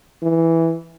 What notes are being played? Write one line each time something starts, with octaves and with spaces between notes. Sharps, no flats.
E3